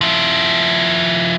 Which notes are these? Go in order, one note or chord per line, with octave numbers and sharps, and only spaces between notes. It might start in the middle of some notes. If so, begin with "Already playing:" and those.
F3 E4